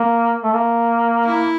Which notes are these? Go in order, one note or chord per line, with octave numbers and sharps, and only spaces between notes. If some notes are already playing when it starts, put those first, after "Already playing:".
Already playing: A#3
A3
A#3
E4